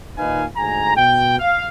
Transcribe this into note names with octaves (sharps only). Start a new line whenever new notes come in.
A#2 D#3 D#4 B4 F5 G#5
D2 G#2 G#5 A#5
B2 G5
F5